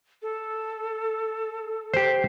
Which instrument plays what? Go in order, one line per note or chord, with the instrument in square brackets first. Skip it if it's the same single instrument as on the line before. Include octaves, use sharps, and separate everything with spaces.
[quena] A4
[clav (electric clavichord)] G4 C5